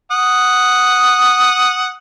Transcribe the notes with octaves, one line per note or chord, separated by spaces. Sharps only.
F#5 D#6